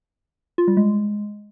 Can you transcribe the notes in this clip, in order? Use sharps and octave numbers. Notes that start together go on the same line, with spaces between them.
F4
G3
G#3